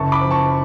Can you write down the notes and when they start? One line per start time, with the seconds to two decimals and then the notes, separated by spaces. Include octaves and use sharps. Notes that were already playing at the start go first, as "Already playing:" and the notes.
Already playing: F#1 A5 C#6
0.12 B5 D6
0.21 F3
0.31 A5 C#6